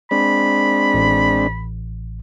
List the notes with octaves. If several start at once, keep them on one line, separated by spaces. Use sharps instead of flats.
G#3 C4 D4 B5
A1